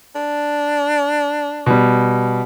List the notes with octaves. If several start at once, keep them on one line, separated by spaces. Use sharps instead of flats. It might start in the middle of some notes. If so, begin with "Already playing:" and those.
D4
B2 G3